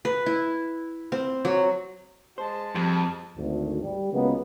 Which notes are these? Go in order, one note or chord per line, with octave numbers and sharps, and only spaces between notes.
B4
E4
C4
F#3
G#3 C5 A5
F2 F3 G3
G#1 D2
G3
C#2 C#3 F#3 G#3 A#3 B3